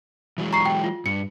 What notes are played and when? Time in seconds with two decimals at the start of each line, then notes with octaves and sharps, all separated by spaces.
0.38 E3 F#3 G#3
0.53 A#5 C#6 C7
0.66 G5
0.84 F4
1.06 G2 C#7